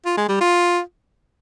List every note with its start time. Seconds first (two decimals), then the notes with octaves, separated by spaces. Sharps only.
0.05 F4
0.17 G#3
0.29 G3
0.40 F4